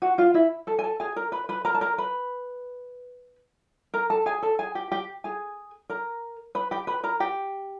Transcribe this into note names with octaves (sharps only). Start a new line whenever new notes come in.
F#4 F#5
F4 F5
E4 E5
A4 A5
G#5
A4 A5
G#4 G#5
A#4 A#5
B4 B5
B4 B5
A#4 A#5
A5
A#4 A#5
B4 B5
A#4 A#5
A4 A5
G#4 G#5
A4 A5
G#4 G#5
G4 G5
G4 G5
G#4 G#5
A#4 A#5
B4 B5
G4 G5
B4 B5
A#4 A#5
G4 G5